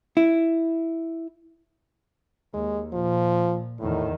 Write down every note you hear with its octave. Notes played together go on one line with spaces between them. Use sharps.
E4
D#2 G#3
A#2 F3
E2 A2 D#3